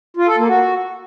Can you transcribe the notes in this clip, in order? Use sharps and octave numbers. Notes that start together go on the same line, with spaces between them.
F4
A4
A#3
F#4